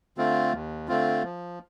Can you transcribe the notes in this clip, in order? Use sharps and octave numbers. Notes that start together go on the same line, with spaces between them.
D3 A3 C4 F4
D#2
D3 A3 C4 F4
F3